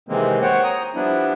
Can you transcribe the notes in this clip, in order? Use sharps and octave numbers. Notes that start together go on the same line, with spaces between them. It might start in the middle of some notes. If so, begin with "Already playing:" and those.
C3 D#3 E3 G#3 A#3 C4
C5 C#5 F#5 G5
A#5 D#6
F3 G3 B3 D4 E4